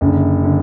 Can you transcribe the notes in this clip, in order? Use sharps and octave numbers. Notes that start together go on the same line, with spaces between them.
F#1 F#2 D3
D3